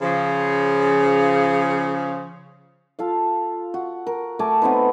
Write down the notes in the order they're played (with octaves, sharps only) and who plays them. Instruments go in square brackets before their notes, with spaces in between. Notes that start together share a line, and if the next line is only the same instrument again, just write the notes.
[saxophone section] C#3 F3
[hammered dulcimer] F4 A4 F5
F#4
A#4
A3 G#5 A5 D6
B3 C4 D#4 B4